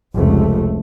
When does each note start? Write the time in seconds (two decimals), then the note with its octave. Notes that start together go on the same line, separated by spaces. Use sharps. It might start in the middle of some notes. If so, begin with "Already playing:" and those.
0.14 F1 C#2 A3